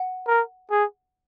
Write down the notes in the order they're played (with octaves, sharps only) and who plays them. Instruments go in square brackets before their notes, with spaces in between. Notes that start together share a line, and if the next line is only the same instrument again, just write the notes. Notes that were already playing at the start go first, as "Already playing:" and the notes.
Already playing: [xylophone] F#5
[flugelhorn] A#4
G#4